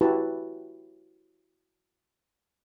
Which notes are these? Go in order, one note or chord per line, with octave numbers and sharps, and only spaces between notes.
E4 F#4 G4 B4 A5